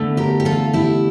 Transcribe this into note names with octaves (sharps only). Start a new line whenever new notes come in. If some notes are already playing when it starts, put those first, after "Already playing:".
Already playing: E2 D3 A3
G4 A#4
G4
F4 A4
E4 G4